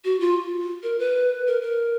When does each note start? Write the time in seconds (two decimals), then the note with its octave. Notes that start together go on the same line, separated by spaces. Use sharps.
0.05 F#4
0.20 F4
0.83 A#4
0.99 B4
1.47 A#4
1.62 A#4